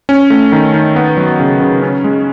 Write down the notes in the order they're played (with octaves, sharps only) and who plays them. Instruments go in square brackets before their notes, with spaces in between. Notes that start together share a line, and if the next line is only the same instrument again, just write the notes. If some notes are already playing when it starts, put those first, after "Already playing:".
[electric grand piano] C#4
A3
D#3
D#3
B3
F#3
C#3
C#3
C#4
G#3